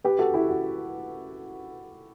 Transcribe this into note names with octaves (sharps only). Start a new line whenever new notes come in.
G4 B4
F#4 A4
E4 G4
F#4